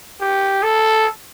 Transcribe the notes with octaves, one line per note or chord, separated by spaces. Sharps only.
G4
A4